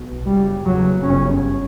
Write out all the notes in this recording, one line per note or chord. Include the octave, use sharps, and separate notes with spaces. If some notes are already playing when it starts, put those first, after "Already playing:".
Already playing: B1 B2
G1 F#2 C#3 G3
F#1 E2 C#3 F#3
G1 F#2 C#3 C#4